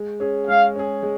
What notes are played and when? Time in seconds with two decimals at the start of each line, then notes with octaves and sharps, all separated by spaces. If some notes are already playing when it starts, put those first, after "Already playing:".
Already playing: G#3
0.20 C#4 G#4
0.47 G#3 F5
0.75 C#4 G#4
1.03 G#3